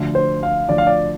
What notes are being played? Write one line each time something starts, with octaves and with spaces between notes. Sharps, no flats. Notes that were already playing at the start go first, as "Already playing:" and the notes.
Already playing: D2 D3 F3
C5
F5
D2 D3 F3 D5
F5
D5